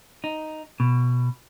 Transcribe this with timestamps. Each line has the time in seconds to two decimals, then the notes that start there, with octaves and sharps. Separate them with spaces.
0.24 D#4
0.80 B2